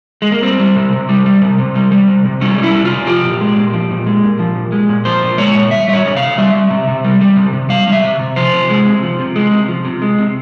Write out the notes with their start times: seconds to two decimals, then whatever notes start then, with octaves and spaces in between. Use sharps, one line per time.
0.22 G#3
0.32 A#3
0.43 G3 C4
0.60 G3
0.76 C3
0.92 C3
1.09 G3
1.26 G3
1.42 C3
1.59 C3
1.75 G3
1.92 G3
2.08 C3
2.25 C3
2.41 G3 C#4
2.58 G3
2.63 E4
2.74 C3
2.85 F4
2.91 C3
3.07 F3 G4
3.24 A#2
3.41 G#3
3.57 A#2
3.74 F3
3.91 A#2
4.06 G#3
4.23 A#2
4.39 F3
4.56 A#2
4.72 G#3
4.89 A#2
5.05 F3 C5
5.23 A#2
5.38 G#3 C#5
5.55 A#2
5.71 G3 E5
5.88 G3 E5
5.94 C#5
6.05 C3
6.17 F5
6.22 C3
6.38 G3 E5
6.54 G3
6.70 C3
6.88 C3
7.04 G3
7.21 G3
7.37 C3
7.53 C3
7.69 G3 F5
7.87 G3
7.92 E5
8.04 C3
8.19 C3
8.36 F3 C5
8.53 C3
8.70 G#3
8.86 C3
9.03 F3
9.19 C3
9.36 G#3
9.52 C3
9.68 F3
9.85 C3
10.02 G#3
10.19 C3